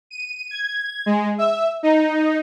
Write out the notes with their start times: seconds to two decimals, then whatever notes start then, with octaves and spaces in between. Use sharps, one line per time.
0.11 D#7
0.51 G#6
1.06 G#3
1.38 E5
1.83 D#4